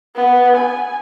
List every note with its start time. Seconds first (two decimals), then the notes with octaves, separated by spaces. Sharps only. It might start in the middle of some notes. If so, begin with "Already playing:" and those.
0.16 B3
0.57 G#5